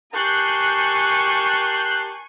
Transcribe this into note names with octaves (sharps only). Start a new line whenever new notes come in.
G4 A#4 G#5 A5 C#6 F#6 G6 C7